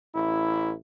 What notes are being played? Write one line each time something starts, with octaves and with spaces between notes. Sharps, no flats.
A1 E4